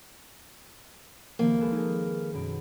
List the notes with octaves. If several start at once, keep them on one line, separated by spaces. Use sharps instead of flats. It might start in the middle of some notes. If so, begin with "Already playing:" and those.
C2 D#3 F3 A#3
G#3 A4 B4
D#4 G#4
F#2 B2 D7